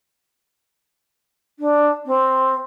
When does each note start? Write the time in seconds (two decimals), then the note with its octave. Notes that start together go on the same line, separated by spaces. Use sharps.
1.59 D4
2.06 C4